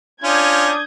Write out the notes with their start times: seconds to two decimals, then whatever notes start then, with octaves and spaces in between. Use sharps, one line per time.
0.24 C#4 D4 F4 D#6 G6 G#6